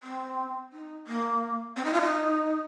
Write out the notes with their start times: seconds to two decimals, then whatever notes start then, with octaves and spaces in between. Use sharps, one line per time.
0.03 C4
0.72 D#4
1.07 A#3
1.76 C4
1.85 D#4
1.93 F4
2.02 D#4